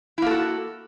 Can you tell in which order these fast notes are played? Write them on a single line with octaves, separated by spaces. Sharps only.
E4 A#3 A4 F#4